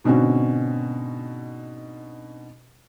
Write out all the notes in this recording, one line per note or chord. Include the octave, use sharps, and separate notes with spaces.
G#2 B2 D3 C4 C#4 F#4